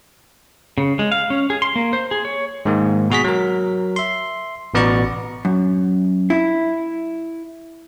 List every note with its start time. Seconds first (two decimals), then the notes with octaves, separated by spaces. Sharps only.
0.78 C#3
0.99 G#3
1.12 F5
1.30 C#4
1.50 G#4
1.62 C6
1.76 A#3
1.93 C5
2.11 G#4
2.25 C#5
2.65 G#2 D#3 A#3
3.10 B2 F#4 G#4 B6
3.24 F#3 A#4
3.96 E5 C6
4.74 A1 B2 B3 D5 A#5 C#6
5.45 F#2
6.30 E4